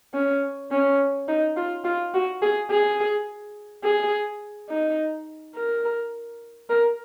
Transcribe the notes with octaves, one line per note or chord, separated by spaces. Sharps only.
C#4
C#4
D#4
F4
F4
F#4
G#4
G#4
G#4
D#4
A#4
A#4